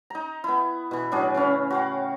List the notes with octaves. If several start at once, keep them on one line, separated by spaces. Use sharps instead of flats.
D#4 A#5
B3 E4
B2 E3
A2 F#3 D4 G#4
C#3 E3 C#4
F#4 F5 G5